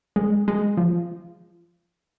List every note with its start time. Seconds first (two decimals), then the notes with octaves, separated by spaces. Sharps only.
0.16 G#3
0.48 G#3
0.77 F3